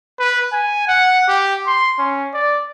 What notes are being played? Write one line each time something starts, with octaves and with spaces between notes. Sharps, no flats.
B4
G#5
F#5
G4
C6
C#4
D5